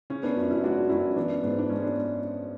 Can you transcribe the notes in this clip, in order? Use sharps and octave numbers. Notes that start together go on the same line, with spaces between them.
C#3 C#4
B3 D4
F#2 C#4
C#4 E4
G#3 D4 F#4
F#2 C#4 E4
E3 B3 D4
G#2 B3
D4
G#3 C#4
B3 D4